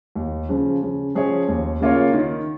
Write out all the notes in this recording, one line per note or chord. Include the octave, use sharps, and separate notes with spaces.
D#2
C#3 F3
C#3
F3 C#4 G#4 C#5
D#2
C#3 A#3 F4 C#5
D#3